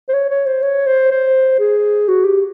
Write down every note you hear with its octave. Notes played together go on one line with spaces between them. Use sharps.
C5
C#5
C#5
C5
C#5
C5
C5
G#4
F#4
G4